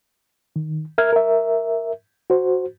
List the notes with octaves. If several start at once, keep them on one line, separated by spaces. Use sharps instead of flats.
D#3
A#4 E5 F6 G#6
A#4 E5
F#4 C5